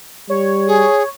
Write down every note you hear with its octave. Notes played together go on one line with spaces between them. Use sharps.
G3 C#5
G#4